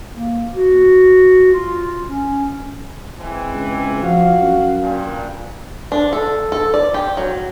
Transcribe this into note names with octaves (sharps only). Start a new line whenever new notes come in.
A#3
F#4
F4
C#4
E3 G#3 C4
C#2
F3 F#4 F5
F#2
G2 A#2
D4
A4
A4
D5
G4
F#3